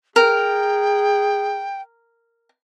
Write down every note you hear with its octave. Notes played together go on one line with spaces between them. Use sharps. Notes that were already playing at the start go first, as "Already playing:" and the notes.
G#4 A#4 G5